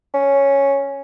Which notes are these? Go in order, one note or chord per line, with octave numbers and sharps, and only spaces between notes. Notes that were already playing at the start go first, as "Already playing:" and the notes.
C#4